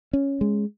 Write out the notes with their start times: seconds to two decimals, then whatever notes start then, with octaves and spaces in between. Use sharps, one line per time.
0.13 C#4
0.41 G#3